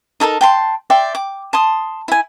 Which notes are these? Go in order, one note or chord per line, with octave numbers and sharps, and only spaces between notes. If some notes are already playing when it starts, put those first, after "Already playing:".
D#4 A4 A#4 A5
G5 A5 C6
D5 E5 G5 C6
D6
A5 C6 D#6
E4 G#5